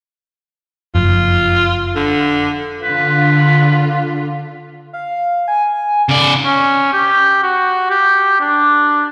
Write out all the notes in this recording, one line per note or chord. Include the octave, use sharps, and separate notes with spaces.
F#1 F2 F4
D3
D3 F4 B4
F5
G#5
C#3 D5
C#4
G4
F#4
G4
D4